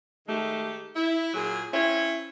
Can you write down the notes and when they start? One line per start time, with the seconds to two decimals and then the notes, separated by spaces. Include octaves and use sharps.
0.27 D#3 G#3 A3 G4
0.95 E4
1.33 A#2 F#3 G#4
1.72 C4 C#4 E4 C#5